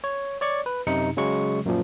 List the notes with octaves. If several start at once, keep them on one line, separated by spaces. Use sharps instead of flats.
C#5
C#5 D5 C#6
B4
F#2 C3 D#4 C#7
C#3 F#3 G#3 C#6
F#2 A#2 F3